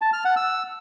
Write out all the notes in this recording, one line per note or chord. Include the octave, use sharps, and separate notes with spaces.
A5
F6
F#5
E6